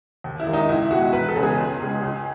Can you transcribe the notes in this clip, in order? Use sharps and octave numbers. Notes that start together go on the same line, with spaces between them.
D#2
E4
D#3 G#3
D#4
C#2 E4
B2 G#3 F#4
E1 B4
B4
A4
E2 C#3 G#3
G#4
C#2
C#3 G#3
C#2